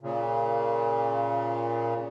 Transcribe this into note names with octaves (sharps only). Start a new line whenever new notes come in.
A#2 C#3